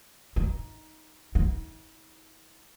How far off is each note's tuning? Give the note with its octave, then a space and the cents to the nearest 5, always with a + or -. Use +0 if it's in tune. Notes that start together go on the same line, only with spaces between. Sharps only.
D#4 +10
D#4 +45